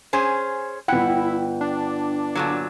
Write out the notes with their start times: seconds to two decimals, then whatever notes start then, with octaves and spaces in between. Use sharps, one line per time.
0.13 C#4 G#4 C5
0.88 G1 E4 F#5 G5
1.61 D4
2.35 A#2 D3 F#3